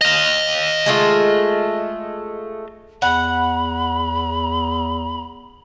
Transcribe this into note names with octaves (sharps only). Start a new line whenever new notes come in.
D#5 F5
G#3 A3 F4
E2 F#5 B5